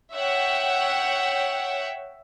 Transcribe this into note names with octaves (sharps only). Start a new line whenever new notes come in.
C#5 E5 F#5 G5